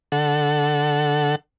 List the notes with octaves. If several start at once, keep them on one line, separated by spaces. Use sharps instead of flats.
D3 A4 F#5